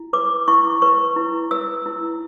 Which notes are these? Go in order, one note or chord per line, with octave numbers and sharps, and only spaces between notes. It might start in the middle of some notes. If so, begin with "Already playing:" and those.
Already playing: E4
B4 D6
E4 C#6
B4 C#6
E4
B4 E6
E4